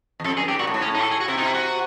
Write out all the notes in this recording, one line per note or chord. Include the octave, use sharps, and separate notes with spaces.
E2
F2 A4
F#2 G#4
G#2 G4
A#2 F#4
A2
G#2
A2 C#4
D#4
A4
G#4
F#4
C3 E4
D#4
E4
F#4